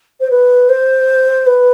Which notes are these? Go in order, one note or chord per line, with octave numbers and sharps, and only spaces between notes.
C5
B4
C5
B4